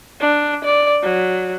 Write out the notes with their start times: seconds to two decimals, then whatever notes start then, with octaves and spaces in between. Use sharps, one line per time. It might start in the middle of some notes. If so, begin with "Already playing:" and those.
0.21 D4
0.64 D5
1.03 F#3